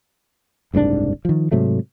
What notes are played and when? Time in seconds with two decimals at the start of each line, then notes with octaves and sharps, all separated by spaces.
0.74 F#1 C2 G#2 D4
1.25 D#3 F3
1.52 G#2 C3 F#3 A3